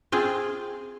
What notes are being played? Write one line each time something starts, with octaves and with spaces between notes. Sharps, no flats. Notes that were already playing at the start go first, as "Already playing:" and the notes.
C4 F4 G#4